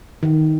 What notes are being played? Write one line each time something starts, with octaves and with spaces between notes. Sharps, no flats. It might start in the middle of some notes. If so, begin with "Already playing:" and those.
D#3